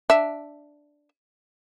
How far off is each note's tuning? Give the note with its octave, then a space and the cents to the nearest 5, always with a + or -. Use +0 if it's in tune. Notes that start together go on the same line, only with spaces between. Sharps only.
D4 +0 E5 +0